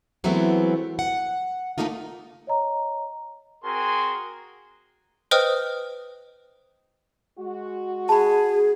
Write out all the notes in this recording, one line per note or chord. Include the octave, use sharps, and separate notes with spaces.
E3 F#3 G#3 A3 B3 C4
F#5
F3 G3 A3 A#3 D#4 F4
C#5 D#5 A#5
C4 F#4 G#4 A#4 G#5 C6
B4 C5 D#5 G5 D#6 F6
G#3 F#4
G#4 A5 B5